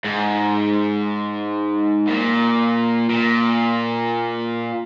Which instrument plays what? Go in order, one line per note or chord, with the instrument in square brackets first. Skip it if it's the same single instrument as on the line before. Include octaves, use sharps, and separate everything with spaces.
[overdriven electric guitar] G#2
A#2
A#2